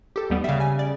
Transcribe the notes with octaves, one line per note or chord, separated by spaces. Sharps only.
G4 A4
D#2 G3 B3
C#3 G3 E5 F5
G#5
D5